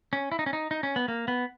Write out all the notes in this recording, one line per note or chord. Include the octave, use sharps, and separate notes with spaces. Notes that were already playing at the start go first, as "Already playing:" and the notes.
C#4
E4
D#4
C#4
D#4
D#4
C#4
B3
A#3
B3